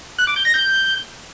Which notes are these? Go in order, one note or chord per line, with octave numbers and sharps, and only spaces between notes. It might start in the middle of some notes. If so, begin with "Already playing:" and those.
F#6
D6
G6
A#6
G6